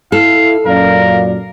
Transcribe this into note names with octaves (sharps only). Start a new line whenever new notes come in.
E4 A4 F5
F#2 A#2 A#4 D5 F5